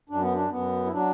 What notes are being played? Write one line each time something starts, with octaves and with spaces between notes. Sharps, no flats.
F#2 D4
B3
D4
F#2 B3
E4
F#3 D4